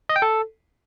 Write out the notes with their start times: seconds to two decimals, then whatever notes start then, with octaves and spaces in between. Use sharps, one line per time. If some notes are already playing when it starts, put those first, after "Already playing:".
0.09 D#5
0.16 G5
0.22 A4